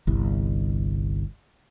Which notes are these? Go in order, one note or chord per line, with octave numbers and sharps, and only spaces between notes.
G1 C2